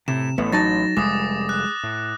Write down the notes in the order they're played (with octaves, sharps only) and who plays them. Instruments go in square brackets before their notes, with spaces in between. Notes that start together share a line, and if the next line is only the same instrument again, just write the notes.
[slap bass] A2 [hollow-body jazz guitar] C3 [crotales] E7
[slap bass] A1 [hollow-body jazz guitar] A2 B3
[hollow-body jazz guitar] F#3 D#4 A5 [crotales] A6 A#6
[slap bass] F1 G3 [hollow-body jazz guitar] G#3 [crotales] D6 D#6
[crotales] F#6
[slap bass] A2